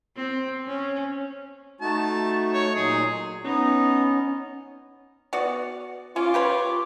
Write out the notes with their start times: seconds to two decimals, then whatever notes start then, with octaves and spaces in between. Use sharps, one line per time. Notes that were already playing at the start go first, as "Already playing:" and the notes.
0.16 C4
0.66 C#4
1.81 A3 D#4 F#4 A5
2.53 C#5
2.76 A#2 F#3 D#4 G#4
3.44 B3 C#4 D#4
5.33 B3 F#4 D5
6.16 C#4 F4 D6
6.34 G4 B4 C#5